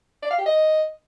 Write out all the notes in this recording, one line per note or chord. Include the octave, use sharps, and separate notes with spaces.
D5
F5
G4
D#5